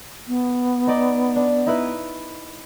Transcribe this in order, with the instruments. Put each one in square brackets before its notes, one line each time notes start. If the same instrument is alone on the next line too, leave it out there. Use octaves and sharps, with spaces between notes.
[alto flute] B3
[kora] D#4 D5 D#5
D4
D#4 E4 B4